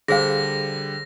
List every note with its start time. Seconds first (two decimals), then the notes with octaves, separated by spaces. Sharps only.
0.08 D3 G3 G#4 C5 F5 A#6